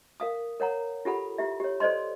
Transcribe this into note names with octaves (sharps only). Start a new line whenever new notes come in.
A#4 F5 D#6
A#4 C#5 F#5 A#5
F4 G4 A4 F#5 B5
E4 G4 E5
G4 C#5
A4 C5 D5 D#5 C6